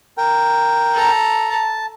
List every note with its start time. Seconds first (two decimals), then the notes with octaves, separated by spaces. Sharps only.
0.17 A#4 G5
0.94 A4 A#5
1.50 A5